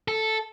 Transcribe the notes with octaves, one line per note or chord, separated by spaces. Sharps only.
A4